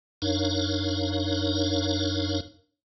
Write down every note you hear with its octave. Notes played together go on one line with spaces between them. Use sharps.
F#2 D4 D#4 A#4 C#5 F5